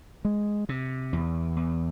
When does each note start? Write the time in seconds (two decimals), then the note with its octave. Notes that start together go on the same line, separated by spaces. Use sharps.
0.25 G#3
0.69 C3
1.13 E2
1.57 E2